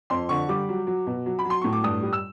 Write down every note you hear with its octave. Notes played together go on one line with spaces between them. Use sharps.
F2 C6
D3 C#6
G3 D6
F#3
F#3
B2
F#3
B5
F#3
C6
A2 C#6
D6
G2 D#6
G3
E6